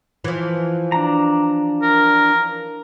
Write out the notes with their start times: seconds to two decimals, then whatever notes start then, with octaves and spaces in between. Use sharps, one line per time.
0.24 E3 F3
0.92 D4 A#5
1.82 A#4